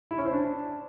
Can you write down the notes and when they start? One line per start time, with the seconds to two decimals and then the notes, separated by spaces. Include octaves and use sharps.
0.11 E4
0.18 C#4
0.25 C5
0.33 D4